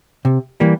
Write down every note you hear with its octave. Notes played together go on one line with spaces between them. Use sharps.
C3
E3 G3 A#3